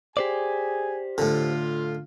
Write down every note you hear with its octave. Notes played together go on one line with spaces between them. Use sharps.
G4 G#4 C5 D5 G#5
A2 D3 F4